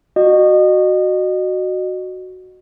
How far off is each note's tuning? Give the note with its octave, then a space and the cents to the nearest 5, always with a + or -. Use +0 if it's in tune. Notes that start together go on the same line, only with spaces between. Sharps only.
F#4 +0 D#5 -30